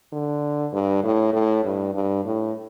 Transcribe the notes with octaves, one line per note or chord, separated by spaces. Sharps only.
D3
G2
A2
A2
G2
G2
A2